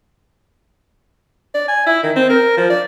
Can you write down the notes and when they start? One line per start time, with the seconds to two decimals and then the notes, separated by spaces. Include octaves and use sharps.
1.55 D5
1.68 G#5
1.86 E4
2.03 D#3
2.16 C4
2.30 A#4
2.57 F3
2.70 D5